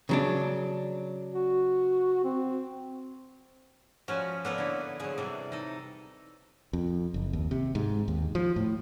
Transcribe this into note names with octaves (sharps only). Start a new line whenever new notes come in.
C#3 F#3 D4
F#4
C4
F3 C#4 F#4 B4
A#3 B3 C#4 A4 B4 D5
D3 E4
D3 F3 F#3 G#4
C3 E3 G3 A4
D#4 A4
F2
F#1
D#2
C3
G#2
D#2
F3
A2